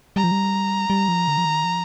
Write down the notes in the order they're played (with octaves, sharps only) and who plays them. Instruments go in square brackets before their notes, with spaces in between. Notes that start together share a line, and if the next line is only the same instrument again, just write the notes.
[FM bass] G3 [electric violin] A#5
[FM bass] F3
G3
G3
F3
D3
F3
D#3
F3